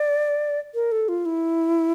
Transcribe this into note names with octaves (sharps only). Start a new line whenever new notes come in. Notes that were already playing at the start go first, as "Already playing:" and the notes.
Already playing: D5
A#4
A4
F4
E4